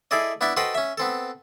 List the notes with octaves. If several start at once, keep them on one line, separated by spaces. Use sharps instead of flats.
E4 G#4 A4 D5 D#5
B3 D4 E4 E5 A5
F#4 A4 B4 C5 D#5 G5
C#4 E5
B3 C4 A4